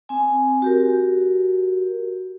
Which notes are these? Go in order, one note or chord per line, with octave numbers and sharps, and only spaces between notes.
C4 G#5
F#4 G4 A#4